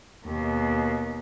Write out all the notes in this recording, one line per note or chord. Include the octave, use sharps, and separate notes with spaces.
D#2 B2